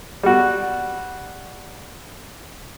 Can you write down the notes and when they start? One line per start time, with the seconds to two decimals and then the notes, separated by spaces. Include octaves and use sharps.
0.23 G3 F#4